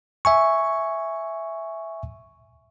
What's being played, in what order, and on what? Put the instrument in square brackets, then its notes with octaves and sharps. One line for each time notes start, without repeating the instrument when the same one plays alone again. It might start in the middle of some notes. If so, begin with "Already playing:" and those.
[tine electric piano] E5 G#5 C#6